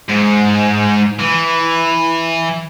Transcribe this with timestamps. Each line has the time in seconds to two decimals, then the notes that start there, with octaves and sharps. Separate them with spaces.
0.09 G#2
1.19 E3